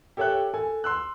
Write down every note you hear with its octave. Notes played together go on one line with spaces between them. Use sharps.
G4 A4 C#5 E5 G5 F#6
A4 G#5
C6 E6 F#6